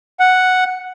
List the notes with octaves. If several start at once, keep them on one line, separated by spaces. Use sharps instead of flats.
F#5